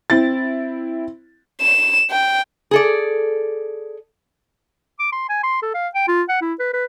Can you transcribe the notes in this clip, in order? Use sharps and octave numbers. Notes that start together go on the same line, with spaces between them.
C4 E4 A6
E7
G5
G#4 A4 D5
D6
C6
G#5
C6
A4
F5
G5
F4
F#5
E4
B4
B4